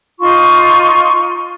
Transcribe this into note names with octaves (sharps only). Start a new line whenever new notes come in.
D#4 F4 C6 C#6